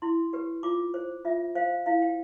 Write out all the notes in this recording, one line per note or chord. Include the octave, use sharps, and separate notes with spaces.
E4 C6
G4 B4
F4 D6
C5
F4 E5
C5 F5
E4 F5
G5